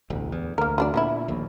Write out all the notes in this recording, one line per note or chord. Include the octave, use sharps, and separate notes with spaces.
E1 A1 D2
E2
D2 A#3 A#4
F#3 D4 D5
A#2 D3 B3 E4
A#1 D#2